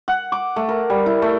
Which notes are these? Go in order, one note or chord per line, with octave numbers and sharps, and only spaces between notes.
F#5
D6
A3
A#4
G3
E4
A3